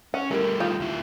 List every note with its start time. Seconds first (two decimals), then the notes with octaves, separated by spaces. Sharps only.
0.14 C#4 F#5
0.31 G3 A3 E4 G4 A#4
0.60 D#3 F4 G4
0.80 D2 E4